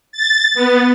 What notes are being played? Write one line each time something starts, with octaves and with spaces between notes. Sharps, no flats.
A6
B3